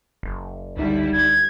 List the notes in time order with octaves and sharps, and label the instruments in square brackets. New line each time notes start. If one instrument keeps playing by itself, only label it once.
[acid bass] F#1
[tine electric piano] C#2 D#4 [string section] D3 G3 E4
[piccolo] G#6